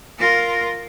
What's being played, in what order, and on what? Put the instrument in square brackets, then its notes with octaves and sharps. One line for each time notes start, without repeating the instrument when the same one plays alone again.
[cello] F4 A#4